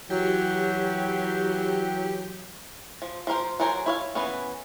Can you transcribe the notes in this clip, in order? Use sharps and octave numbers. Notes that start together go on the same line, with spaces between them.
E3 F#3 G4
F3
F3 F4 A#4 C5
F#3 A4 A#4 C5 G#5
E4 C#5 F5
E3 B3 C#4